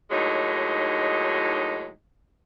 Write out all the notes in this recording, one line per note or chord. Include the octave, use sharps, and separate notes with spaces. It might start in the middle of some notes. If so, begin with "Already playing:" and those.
D#2 A2 F#3 G#3 D#4